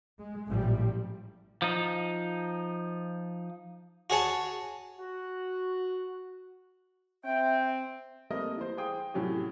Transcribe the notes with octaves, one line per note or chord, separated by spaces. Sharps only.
G#3
A1 A#2 F3 G3
F3 D#4
F#4 G#4 C#5 A5
F#4
C4 E5 G5
G3 A3 A#3 C4 A#4 D#5
E3 C5
G#4 C5 F5 G5 D#6
A2 C3 F#3 C#4 F#4 G4